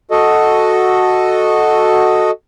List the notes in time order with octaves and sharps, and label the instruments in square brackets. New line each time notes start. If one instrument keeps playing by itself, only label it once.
[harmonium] F#4 A4 D#5